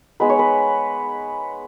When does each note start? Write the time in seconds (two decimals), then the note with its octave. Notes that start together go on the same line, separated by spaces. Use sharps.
0.20 G#3 B3 D#4 B4
0.30 C#5
0.39 B4